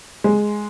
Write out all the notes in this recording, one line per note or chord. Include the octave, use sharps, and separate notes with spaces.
G#3